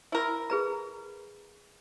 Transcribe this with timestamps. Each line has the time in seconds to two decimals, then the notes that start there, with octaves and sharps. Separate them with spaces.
0.12 E4 A#4
0.50 G#4 B4 A#5